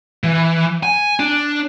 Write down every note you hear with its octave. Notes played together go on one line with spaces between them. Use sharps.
E3
G#5
D4